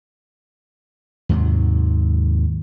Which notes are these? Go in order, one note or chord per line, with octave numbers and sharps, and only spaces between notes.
D#2 G#2 C3 F#3